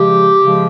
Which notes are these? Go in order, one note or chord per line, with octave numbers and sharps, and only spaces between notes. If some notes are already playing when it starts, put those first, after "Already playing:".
Already playing: C#3 F3 G#3 G4
C#3 F3 G#3